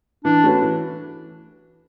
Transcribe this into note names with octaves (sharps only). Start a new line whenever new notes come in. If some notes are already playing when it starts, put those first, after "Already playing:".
E3 D4
A3 C#4 F#4 B4
E3